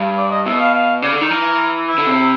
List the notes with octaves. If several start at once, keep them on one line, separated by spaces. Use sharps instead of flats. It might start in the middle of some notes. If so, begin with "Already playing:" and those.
Already playing: G2
D5
D#5
B2 E5
F5
F5
C#3 D5
D3
D#3
E3 A#4
E4
D3
C3